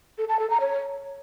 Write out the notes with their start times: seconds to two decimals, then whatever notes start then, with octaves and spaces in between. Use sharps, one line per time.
0.18 A4
0.29 A5
0.39 A4
0.50 A#5
0.60 C#5